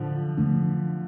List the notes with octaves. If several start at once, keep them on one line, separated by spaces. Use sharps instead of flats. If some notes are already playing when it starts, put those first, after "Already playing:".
Already playing: A2 D3 F3
D3 F3 A3 D4